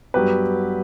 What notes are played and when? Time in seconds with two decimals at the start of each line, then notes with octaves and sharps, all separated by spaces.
0.14 G2 F#3 B3 G4 B4